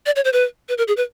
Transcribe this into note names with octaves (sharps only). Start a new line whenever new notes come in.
D5
C#5
C5
B4
B4
A#4
G#4
B4